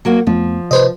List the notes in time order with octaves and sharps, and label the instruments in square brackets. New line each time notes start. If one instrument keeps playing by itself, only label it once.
[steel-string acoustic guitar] F#3 A#3 F#4
[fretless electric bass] F2 A3 B3 [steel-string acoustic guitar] F3
[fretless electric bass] C3 [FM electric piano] B4 C5 D#5